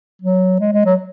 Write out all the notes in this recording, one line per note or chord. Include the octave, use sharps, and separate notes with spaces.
F#3
G#3
G#3
F#3